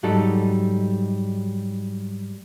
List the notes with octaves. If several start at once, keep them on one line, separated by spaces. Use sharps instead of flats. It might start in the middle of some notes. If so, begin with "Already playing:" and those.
G#2 F#3 G3 D#4 A4